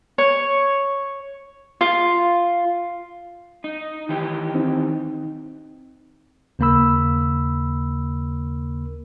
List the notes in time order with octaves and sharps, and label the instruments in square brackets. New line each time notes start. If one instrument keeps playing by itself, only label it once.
[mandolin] C#5
F4
[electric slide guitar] D#4
D#3 E3 G4
[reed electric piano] C4 D#4
[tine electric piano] D#2 C#3 A#3 A#4 B5 E6